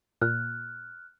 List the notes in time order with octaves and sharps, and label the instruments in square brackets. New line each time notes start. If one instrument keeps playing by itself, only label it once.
[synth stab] A#2 [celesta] F6 F#6